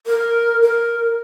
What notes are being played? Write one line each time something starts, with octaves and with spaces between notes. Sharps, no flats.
A#4
A#4